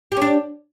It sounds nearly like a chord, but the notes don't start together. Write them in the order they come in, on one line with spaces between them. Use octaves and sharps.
G4 C#4 D4